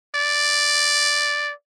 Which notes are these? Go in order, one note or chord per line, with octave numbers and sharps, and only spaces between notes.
D5